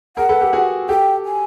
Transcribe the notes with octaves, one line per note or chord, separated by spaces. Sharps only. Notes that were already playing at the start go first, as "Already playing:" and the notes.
G#4 A#4 F#5
A4 B4
G4 A4
F#4 G#4
G4 A4 G5
G#5